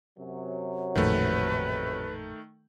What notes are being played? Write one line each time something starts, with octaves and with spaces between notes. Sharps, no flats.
F#2 C3 F#3
A1 F2 A#2 D#3 A3 B4